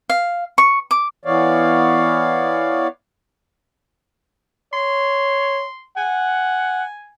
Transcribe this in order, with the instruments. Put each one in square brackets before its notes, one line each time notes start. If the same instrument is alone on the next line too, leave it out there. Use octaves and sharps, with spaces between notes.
[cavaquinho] F5
C#6
D6
[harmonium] E3 B3 C#5 D5 F5
[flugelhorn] C#5 [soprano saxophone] C6
[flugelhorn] F#5 [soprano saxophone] G#5